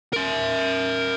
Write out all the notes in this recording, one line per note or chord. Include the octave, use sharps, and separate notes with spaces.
A#4 E5